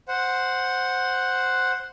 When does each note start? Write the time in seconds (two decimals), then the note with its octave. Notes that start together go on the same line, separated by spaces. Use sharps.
0.08 C5 F#5